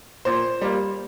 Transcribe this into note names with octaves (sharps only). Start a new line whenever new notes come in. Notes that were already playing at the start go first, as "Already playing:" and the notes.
A#2 C5
G3 A#3